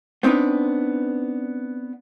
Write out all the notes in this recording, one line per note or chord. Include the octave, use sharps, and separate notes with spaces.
B3 C4 D4 D#4 B4